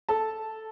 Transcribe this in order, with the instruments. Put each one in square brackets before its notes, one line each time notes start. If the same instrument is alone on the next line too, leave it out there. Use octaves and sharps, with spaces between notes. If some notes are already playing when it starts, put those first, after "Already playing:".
[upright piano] A4 A5